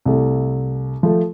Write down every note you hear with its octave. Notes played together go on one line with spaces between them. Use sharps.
C2 A3
F3 A3